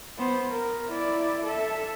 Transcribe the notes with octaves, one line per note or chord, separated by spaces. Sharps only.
B3 C5
A#4
E4 D5
A4 E5